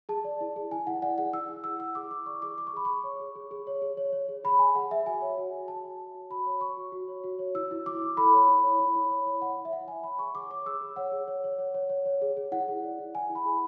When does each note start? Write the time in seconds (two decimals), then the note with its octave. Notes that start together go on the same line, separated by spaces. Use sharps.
0.09 G#4 A5
0.25 D5
0.41 E4
0.56 G#4
0.71 E4 G#5
0.87 E4 F#5
1.02 D5 F#5
1.18 G#4 F#5
1.33 E4 E6
1.49 E4
1.64 G#4 E6
1.80 E4 E6
1.95 G#4 D6
2.11 E4 D6
2.26 D5 C#6
2.42 G#4 D6
2.58 G#4 D6
2.67 C#6
2.73 G#4 B5
2.85 G#4 C#6
3.04 C#5
3.20 G#4
3.36 G#4
3.51 G#4
3.67 C#5
3.82 G#4
3.97 C#5
4.12 C#5
4.29 G#4
4.44 G#4 B5
4.59 G#4 G#5
4.75 G#4 F#5
4.91 G#4 E5
5.06 F#4 G#5
5.22 C#5
5.38 F#4
5.53 F#4
5.68 C#5 A5
5.84 F#4
6.00 F#4
6.14 F#4
6.30 F#4 B5
6.46 C#5
6.61 C#5 C#6
6.77 F#4
6.92 F#4
7.08 C#5
7.24 F#4
7.39 C#5
7.55 E4 E6
7.71 E4
7.86 E4 D6
8.02 E4
8.17 A4 B5
8.33 C#5
8.48 E4
8.63 C#5
8.79 E4
8.95 E4
9.10 C#5
9.26 C#5
9.41 C#5 F#5
9.57 E4
9.65 E5
9.72 C#5 F#5
9.88 E4 G#5
10.03 C#5 B5
10.19 G#4 C#6
10.34 G#4 D6
10.50 C#5 D6
10.66 G#4 E6
10.81 G#4
10.96 C#5 F#5
11.12 G#4
11.28 C#5
11.44 C#5
11.59 C#5
11.74 C#5
11.89 C#5
12.06 C#5
12.22 G#4
12.37 G#4
12.52 E4 F#5
12.68 G#4
12.83 D5
12.99 E4
13.14 E4 G#5
13.30 E4
13.35 B5
13.46 G#4